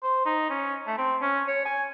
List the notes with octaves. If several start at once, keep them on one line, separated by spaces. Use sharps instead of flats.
C5
D#4
C#4
A3
C4
C#4
C#5
G#5